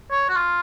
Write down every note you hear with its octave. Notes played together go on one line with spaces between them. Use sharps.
C#5
F#4
F4